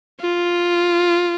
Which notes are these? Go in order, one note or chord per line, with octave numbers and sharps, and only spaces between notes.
F4